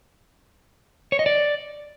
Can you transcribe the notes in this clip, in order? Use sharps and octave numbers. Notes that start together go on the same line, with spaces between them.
C#5
D#5
D5